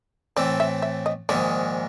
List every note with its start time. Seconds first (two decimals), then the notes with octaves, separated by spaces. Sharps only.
0.36 A2 E3 A3 C4 D5
0.60 E5
0.82 E5
1.06 D#5
1.29 A#1 G#2 D#3 G#3 D5